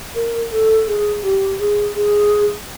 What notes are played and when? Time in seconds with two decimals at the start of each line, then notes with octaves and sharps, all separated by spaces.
0.15 A#4
0.52 A4
0.87 G#4
1.23 G4
1.59 G#4
1.95 G#4